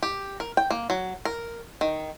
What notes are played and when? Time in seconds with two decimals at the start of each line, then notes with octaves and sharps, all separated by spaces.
0.03 G4
0.40 A#4
0.57 G5
0.71 A#3
0.90 F#3
1.25 A#4
1.81 D#3